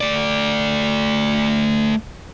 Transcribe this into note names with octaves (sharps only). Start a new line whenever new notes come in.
A3 D5